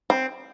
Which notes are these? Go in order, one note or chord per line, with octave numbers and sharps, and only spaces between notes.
C4